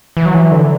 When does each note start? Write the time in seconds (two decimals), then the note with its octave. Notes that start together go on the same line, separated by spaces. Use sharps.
0.17 E3
0.26 F#3
0.35 E3
0.51 D3